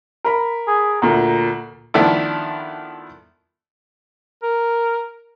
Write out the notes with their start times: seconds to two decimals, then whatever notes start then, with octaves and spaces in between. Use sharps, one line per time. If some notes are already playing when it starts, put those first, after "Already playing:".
0.24 A#4 B5
0.67 G#4
1.02 D2 A#2 A#5
1.94 D#3 F3 A3 B3 D4 E4
4.43 A#4